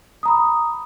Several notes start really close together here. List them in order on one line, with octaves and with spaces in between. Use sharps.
D#6 A#5 B5